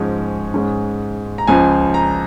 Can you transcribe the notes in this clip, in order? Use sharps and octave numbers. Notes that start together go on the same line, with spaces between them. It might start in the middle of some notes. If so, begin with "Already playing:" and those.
Already playing: G#2 F3 G#3 C#4
G#2 G#3 C#4
A#5
C#2 C#3 F3 G#5
A#5